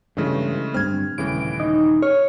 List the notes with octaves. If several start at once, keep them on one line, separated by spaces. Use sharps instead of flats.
G2 C#3 E3 G#3 A3
D1 G2 C4 F6 G#6
D#1 C2 A2 C#3 E3 D7
D#4
C#5 F6